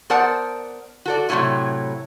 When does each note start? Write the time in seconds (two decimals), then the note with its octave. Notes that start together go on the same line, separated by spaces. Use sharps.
0.10 B3 A#4 C5 D5 F#5 A5
1.06 F#4 A4 D5
1.29 A2 C3 F3 F#3 A3 E4